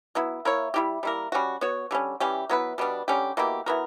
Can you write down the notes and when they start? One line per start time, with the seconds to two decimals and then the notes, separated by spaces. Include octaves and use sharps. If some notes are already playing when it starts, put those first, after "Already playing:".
0.15 F#3 B3 E4
0.45 A#3 E4 A#4 C#5
0.74 G3 A#3 E4 G4
1.03 G3 A#3 E4 A#4
1.32 G3 C#4 F#4
1.61 B3 F#4 C#5
1.91 D3 G3 C#4
2.20 E3 G3 C#4 G4
2.49 F#3 B3 E4 B4
2.78 B2 G3 B3 D4
3.08 D3 G3 C#4 G4
3.37 B2 A#3 E4 G4
3.66 E3 B3 F#4 A#4